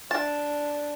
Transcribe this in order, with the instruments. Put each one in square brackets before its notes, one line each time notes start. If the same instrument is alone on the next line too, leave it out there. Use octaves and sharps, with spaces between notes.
[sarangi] D4 [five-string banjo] A5